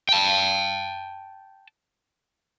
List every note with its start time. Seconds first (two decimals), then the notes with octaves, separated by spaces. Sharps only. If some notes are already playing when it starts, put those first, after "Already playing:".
0.09 G5 A5